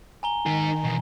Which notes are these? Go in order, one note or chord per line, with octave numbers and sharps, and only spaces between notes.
G#5 A#5 G7
D#3 D#4 G#4
E2 B2